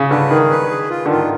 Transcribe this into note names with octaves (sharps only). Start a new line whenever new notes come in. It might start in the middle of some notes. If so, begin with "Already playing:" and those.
Already playing: C#3
D3 B4
D#3 G#4
B4
G#4
F4
D3
D#3 F4
D#3